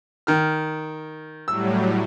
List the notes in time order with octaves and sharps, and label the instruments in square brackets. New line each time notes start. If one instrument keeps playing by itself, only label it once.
[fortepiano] D#3 F6
[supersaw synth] A2 F#3 G3 [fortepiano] E6